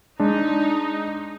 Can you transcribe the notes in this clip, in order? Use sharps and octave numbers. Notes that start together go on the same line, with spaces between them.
G#3 D4 D#4